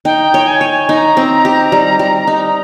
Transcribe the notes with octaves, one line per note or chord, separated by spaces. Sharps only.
D#4 G5
C#5
G#5
C#5
D#4 A#5
C4
G4
G3
G3
D#4